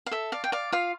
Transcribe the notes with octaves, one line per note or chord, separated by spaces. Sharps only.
F5
A4 E5
D5 F5
G5
D5 F5
F4 F5